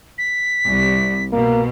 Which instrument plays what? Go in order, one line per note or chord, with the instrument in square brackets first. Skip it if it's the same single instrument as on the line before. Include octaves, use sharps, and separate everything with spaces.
[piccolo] B6
[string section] C2
[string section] B2 [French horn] A#3